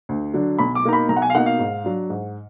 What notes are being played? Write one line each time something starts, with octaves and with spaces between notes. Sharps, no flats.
D2
D3 F#3 D4
B1 B5
D6
B2 A#3 D#4 A#5
B5
B1 A#5
F#5
G#5
F5
B2 A#3 D#4 F#5
F5
G#2
F#3 D4
G#2